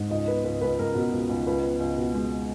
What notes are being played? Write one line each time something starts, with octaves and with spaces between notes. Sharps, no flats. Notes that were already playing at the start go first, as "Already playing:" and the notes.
Already playing: G#2
C#2 D#5
B3 B4
C#2 B4
C#2 B4
C#2 A#4
B2
C#2
C#2
C#2 B4
B3
C#2
B2
G#3